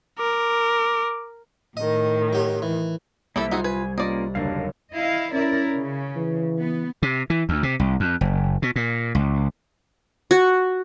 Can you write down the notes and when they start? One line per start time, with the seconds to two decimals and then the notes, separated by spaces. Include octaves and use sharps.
0.19 A#4 D6
1.77 A2 D#3 D#5
2.33 F#3 G4
2.62 E3
3.36 C2 A#3 E4 G4 A4 E5
3.51 D#4 F4 F#4 G#4
3.64 B4 G#5
3.98 A#3 C#4 F4 A#4 D5 D#5
4.35 F#1 D#2 D3 D4 A#4 F5
4.94 E4 D#5 F5
5.33 C#4 E4 A#4 D5
5.75 C#3
6.16 E3
6.59 B3
7.03 C3
7.30 E3
7.49 D2
7.63 C3
7.80 C2
8.00 F2
8.21 F#1
8.62 B2
8.76 A#2
9.15 C#2
10.31 F#4